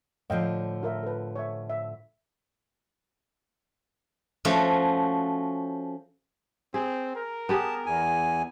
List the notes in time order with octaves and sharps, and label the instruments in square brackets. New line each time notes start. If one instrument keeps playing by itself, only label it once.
[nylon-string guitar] A2 D3 F3 [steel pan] D#5 F5 G5
[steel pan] F4 A#4 E5
A4 B4
C#5 E5
E5
[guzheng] F3 A3 C#4 F#4
[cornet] C4 [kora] G#4
[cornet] A#4
[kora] B3 G4 G#4 [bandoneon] A5
[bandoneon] E2 G#5